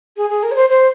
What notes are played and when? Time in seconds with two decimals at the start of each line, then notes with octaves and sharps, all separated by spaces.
0.17 G#4
0.30 G#4
0.43 A#4
0.51 C#5
0.56 C5
0.69 C5